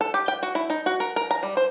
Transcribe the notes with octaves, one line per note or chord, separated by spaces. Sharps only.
A4
G4
G5
F#4
E4
D#4
F#4
A#4
A#4
A#5
G3
C5